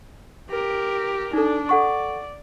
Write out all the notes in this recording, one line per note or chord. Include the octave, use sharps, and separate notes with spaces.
G4 A#4
D4 D#4 A4
A4 D5 F#5 C#6